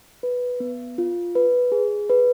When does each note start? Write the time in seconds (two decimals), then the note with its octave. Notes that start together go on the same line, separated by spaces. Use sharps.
0.23 B4
0.60 B3
0.98 F4
1.35 B4
1.72 G#4
2.10 B4